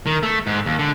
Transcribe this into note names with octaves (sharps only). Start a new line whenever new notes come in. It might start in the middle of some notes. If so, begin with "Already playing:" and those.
D#3
A3
G#2
D#2
D3